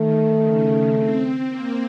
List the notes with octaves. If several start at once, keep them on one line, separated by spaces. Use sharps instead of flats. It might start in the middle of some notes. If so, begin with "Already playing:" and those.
Already playing: D#3 A3
C#3
C4
A#3